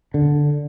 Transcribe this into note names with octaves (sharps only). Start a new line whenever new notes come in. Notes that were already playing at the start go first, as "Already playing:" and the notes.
D3